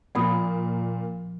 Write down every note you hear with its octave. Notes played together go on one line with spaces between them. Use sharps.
A#2 F3 A#3 B5 D#6